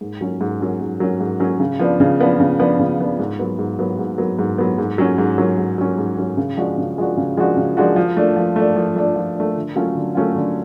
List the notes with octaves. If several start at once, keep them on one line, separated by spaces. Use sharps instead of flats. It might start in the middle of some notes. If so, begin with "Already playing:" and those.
G#2
F#3 C#4
G#2
F#3 C#4
G#2
F#3 C#4
G#2
F#3 C#4
C#3
F3 B3 D4
C#3
F3 B3 D4
C#3
F3 B3 D4
C#3
F3 B3 D4
G#2
F#3 B3
G#2
F#3 B3
G#2
F#3 B3
G#2
F#3 B3
G#2
F#3 C#4
G#2
F#3 C#4
G#2
F#3 C#4
G#2
F#3 C#4
C#3
F3 G#3 D4 F#4
C#3
F3 G#3 D4 F#4
C#3
F3 G#3 D4 F#4
C#3
F3 G#3 D4 F#4
F3
A3 D4
F3
A3 D4
F3
A3 D4
F3
A3 D4
D3
F#3 A3 C#4 F4
D3
F#3 A3 C#4 F4
D3